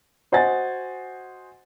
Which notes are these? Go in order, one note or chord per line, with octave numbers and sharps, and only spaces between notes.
F#4 C5 D#5 F#5 G#5 A6